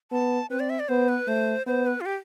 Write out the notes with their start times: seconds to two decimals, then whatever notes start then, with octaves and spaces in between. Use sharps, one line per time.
0.11 B3 A5
0.50 C4 B4
0.60 D5
0.70 E5
0.80 D5
0.88 B3 C5
1.09 B4
1.27 A3 C5
1.66 B3 C5
1.86 B4
2.01 F4
2.06 G4